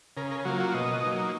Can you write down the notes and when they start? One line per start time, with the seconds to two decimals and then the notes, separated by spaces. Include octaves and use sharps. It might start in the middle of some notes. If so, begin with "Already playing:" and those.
0.17 C#3 A#4
0.31 A#4
0.45 F#3 A#3 F4 F#4
0.60 F#4
0.74 B2 D#5
1.03 F#3 A#3 D#4